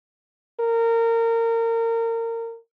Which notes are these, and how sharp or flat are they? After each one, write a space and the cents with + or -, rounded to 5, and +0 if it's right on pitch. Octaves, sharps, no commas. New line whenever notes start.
A#4 -25